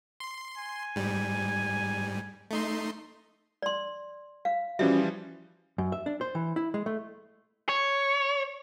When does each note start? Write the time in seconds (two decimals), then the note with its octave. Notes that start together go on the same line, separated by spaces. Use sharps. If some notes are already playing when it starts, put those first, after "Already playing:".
0.20 C6
0.58 G#5
0.96 G#2 G3
2.51 A3 D#4 C6
3.62 D5 C6
4.45 F5
4.79 E3 F3 G3 C#4 F#4 E5
5.78 F#2
5.92 E5
6.06 D4
6.21 C5
6.35 E3
6.56 E4
6.74 G#3
6.86 A3
7.69 C#5